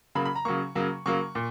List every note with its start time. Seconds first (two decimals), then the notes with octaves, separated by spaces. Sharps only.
0.15 C#3 F#3 A#3 B5
0.25 B5
0.36 A#5
0.45 C#3 F#3 A#3 C#6
0.75 C#3 F#3 A#3
1.06 C#3 F#3 A#3 C#6
1.35 A#2